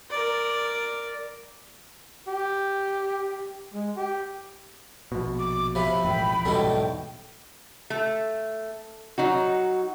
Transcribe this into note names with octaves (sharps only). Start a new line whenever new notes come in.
A#4 D5
G4
G#3
G4
A#1 B2
D6
C3 F3 B5
E1 A1 G5
B1 E2 G#2 B2 G3 A3
A3
F#3 D#4 F#4